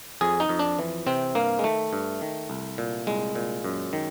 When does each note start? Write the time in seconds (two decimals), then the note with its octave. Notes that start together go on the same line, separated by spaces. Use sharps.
0.21 F2 G#4
0.40 D#4
0.49 F2
0.59 D4
0.79 E3
1.07 C3 C4
1.35 G2 A#3
1.59 G#3
1.64 D#3 A3
1.93 G2
2.22 D#3
2.50 C2
2.78 A#2
3.07 C2 G#3
3.35 A#2
3.65 F#2
3.93 D#3